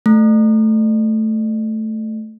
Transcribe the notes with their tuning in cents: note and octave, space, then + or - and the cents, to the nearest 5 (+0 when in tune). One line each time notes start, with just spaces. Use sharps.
A3 -5